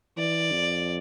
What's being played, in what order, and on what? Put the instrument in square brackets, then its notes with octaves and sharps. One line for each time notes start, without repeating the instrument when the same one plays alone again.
[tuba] E3 [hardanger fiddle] D5
[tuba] F2